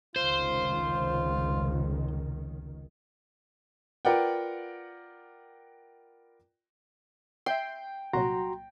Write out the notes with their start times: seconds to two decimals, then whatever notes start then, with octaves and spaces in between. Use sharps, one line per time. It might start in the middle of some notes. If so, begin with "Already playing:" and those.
0.16 F1 C#2 D#3 F4 C5
4.05 F4 A#4 B4 D5 F#5 G5
7.46 E5 G5 C6
8.13 C2 A#2 F#3 F#4 A#5 C6